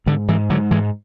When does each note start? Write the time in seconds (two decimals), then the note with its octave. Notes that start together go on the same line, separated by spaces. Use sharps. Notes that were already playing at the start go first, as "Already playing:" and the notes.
0.06 G#2 D3
0.28 G#2 E3
0.50 G#2 D3 F#3
0.71 G#2 E3 G#3